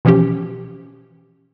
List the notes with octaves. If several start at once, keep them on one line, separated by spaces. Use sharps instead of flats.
B2 E3 F3 C#4 G4